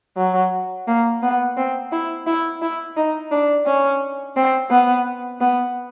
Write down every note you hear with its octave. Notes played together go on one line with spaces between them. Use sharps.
F#3
A#3
B3
C4
E4
E4
E4
D#4
D4
C#4
C4
B3
B3